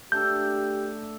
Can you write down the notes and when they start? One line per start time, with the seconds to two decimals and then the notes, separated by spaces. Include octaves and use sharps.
0.12 A3 D4 G4 A4 G6